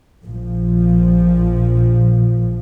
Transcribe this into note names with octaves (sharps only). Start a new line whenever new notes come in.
A#1 F3